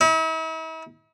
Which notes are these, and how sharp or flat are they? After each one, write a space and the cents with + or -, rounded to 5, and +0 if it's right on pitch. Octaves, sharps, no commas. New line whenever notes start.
E4 -45